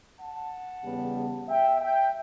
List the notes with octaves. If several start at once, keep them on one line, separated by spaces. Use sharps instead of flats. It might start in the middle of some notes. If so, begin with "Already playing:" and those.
F#5 A5
E2 C#3 G3 B3
E5 G5
E5 G5